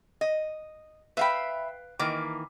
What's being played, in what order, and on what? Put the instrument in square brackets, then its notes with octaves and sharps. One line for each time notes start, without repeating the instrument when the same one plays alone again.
[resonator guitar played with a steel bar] D#5
[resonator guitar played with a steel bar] B4 F5 G5 [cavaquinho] E5 B5
[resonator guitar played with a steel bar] D#3 E3 A#3 [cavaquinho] D6